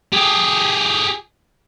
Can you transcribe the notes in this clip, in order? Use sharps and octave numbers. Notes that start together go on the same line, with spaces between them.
G4 G#4